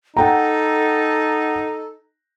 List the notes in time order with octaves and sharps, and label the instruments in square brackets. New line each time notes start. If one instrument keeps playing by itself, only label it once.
[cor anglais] D#4 [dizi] A4 [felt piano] F#5 G5 A#5